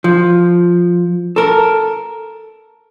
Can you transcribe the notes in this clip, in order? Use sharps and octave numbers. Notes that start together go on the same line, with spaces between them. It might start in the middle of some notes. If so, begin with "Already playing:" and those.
F3
A4 A#4